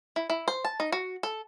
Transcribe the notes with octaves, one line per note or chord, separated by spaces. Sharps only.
E4
E4
C5
A5
D#4
F#4
A4